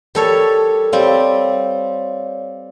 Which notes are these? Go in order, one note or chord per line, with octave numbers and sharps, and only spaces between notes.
G3 A4 A#4 C#5
G3 C4 C#5 D5 F5